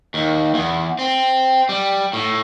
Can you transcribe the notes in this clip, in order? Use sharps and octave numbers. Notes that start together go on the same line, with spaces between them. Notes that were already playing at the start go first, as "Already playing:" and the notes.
D#2
E2
C4
G3
A2